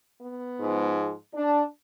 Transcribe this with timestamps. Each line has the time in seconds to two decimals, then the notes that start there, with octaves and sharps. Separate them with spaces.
0.21 B3
0.59 G#2 F3 G#3
1.35 D4